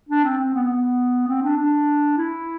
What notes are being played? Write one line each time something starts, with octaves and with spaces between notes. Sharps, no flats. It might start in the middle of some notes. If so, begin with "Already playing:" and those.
D4
C4
C4
B3
B3
C4
D4
D4
E4